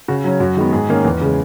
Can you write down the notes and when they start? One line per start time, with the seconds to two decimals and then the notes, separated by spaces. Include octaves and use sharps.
0.08 C#3 F#4
0.24 F#3 C#4
0.40 F#2 F#4
0.57 D#3 G#3 B3
0.73 G#2 G#4
0.89 D#3 A#3 C#4
1.05 E2
1.21 C#3 G#3